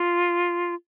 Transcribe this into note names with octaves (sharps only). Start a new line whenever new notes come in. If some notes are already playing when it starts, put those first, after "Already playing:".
Already playing: F4